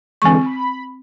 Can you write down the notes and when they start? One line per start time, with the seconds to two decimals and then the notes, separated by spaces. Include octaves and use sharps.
0.22 D3 E3 G#3 C4 C#6
0.46 B5